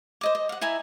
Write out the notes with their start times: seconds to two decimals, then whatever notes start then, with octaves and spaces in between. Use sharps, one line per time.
0.21 C5 D#5 D6
0.35 D#5
0.49 F5 F#5
0.61 E4 E5 G#5 A#5